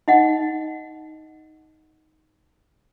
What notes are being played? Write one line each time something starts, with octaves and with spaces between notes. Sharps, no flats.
D#4 D#5 F#5